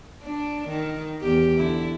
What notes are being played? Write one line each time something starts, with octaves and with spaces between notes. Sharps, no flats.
D4
D#3
E2 G4
D3 E4